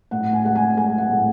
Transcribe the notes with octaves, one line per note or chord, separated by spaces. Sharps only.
A2 F#5
G#5
G#3 F#5
G#5
G#3 G#5
F#5
A2